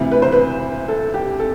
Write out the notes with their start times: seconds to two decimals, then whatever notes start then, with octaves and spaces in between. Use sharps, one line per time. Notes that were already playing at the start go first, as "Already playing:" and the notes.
Already playing: D2 C3 E3
0.12 B4
0.22 C5
0.32 B4
0.88 A4
1.14 G4
1.39 A4